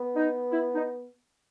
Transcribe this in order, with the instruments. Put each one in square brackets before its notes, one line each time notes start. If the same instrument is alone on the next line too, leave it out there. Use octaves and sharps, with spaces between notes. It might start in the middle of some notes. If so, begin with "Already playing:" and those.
Already playing: [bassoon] B3
[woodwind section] D#4
E4
D#4